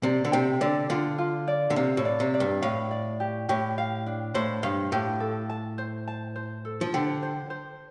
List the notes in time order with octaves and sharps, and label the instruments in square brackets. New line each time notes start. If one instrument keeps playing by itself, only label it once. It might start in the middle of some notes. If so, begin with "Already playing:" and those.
[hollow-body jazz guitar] C3 [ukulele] D5
[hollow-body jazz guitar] D3
[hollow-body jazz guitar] C3 [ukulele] G5
[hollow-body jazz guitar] D3 [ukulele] D5
[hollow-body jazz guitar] D3 [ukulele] F4
[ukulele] F4
D5
[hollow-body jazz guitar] D3
[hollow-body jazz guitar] C3 [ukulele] F5
[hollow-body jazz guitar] A2
[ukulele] D5
[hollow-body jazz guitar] C3
[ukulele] D5
[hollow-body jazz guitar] G2
[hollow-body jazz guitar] A2 [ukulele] F5
[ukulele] D5
G4
[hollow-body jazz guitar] A2 [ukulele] G4
[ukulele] F5
D4
[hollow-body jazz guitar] A2 [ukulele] C5
[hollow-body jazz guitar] G2 [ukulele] F5
[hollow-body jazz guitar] A2 [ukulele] G4
[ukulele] A4
A5
C5
A5
C5
A4
[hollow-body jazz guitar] F3
[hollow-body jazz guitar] D3 [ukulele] G4
[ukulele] C5
C5